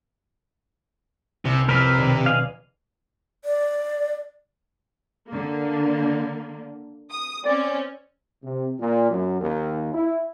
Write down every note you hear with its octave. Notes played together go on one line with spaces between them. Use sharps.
C2 C3 C#7
F2 C3 A#4 B4 E6 F6
D#2 B2 D4
G#4 D#5 F5
D5
D3 A#3
D#6
C4 C#4 D5
C3
A#2
F#2
D#2
E4